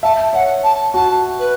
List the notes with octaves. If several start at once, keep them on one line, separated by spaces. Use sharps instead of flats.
E5 A5
C#5 F#5
A5
F#4 A5
B4